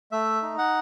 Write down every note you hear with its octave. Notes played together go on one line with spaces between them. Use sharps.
A3 E5
D#4
F#5